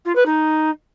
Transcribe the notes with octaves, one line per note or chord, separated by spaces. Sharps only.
F4
B4
D#4